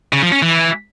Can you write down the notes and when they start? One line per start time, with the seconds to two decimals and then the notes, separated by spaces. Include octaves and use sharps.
0.13 C#3
0.23 F3
0.32 C#4
0.42 E3